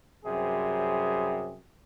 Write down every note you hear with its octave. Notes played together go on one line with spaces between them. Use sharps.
F#2 C3 G3 C4 G#4